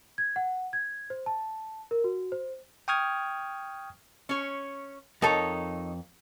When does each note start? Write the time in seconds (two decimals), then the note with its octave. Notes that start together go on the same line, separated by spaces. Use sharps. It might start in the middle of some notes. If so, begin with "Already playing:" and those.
0.18 G#6
0.36 F#5
0.73 G#6
1.10 C5
1.26 A5
1.91 A#4
2.04 F#4
2.32 C5
2.88 G5 C#6 D#6 F6 G#6
4.29 C#4 C#5
5.22 F2 D#4 A4 A#4 C#5 A5